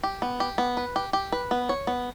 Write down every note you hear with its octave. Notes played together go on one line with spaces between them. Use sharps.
G4
B3
G4
B3
B4
G4
G4
B4
B3
C#5
B3